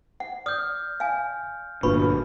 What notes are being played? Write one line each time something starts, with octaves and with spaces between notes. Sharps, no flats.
F#5
D5 D#6 F6 G6
F5 G#5
G1 A#2 D4 F4 F#4 B4 B5 C#6